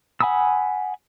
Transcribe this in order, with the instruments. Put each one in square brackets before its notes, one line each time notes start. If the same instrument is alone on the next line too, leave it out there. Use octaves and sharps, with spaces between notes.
[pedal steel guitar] F#5 G#5 B5 D#6 E6